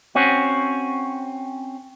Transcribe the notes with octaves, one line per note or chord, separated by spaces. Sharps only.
C4 C#4 F#4